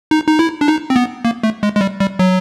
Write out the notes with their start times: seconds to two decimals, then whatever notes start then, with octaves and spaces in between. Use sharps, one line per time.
0.11 D#4
0.27 D#4
0.39 E4
0.61 D4
0.68 D#4
0.90 C4
0.96 B3
1.25 A#3
1.43 A3
1.63 G#3
1.76 G#3
1.81 G3
2.00 G3
2.19 F#3